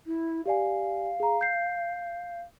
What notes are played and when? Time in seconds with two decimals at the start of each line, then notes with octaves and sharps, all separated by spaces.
0.06 E4
0.46 G4 D5 F5 G#5
1.20 G#4 A#5
1.41 G6 C7